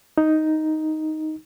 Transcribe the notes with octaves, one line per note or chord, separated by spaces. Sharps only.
D#4